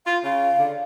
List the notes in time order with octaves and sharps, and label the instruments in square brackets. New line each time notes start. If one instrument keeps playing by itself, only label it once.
[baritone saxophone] F4 [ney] F5
[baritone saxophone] C#3 [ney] F5
[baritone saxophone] D3